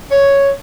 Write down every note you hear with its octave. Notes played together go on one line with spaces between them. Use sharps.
C#5